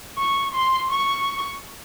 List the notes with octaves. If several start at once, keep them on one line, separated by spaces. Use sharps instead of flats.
C#6
C6
C#6